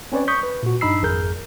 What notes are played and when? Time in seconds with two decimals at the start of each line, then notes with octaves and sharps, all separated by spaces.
0.12 C4 C#4 B4 C#5 D5
0.28 C#6 D#6 G6 B6
0.43 B4
0.63 A#2 F#4
0.81 G2 D4 D#4 B5 E6 C7
1.02 G#1 F2 G#4 A#4 G6